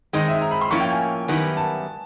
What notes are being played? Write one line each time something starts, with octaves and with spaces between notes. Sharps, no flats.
D#3 G#3 C4 D#4 D#5
E5
A#5
B5
C6
A2 F3 A#3 C#4 E4 C#6
G5
G#5
F#2 D#3 G3 B3 E4
A5